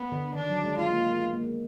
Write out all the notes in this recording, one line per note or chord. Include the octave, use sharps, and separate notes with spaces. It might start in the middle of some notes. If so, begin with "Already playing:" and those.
Already playing: B3
D3
D#3 D4
F#3
G#3
G#3 F4
A#3
A#3
G#3
B3
A#3
G#3